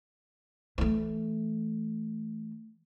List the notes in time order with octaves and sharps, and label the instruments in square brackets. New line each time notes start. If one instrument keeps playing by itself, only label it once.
[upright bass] E3 A3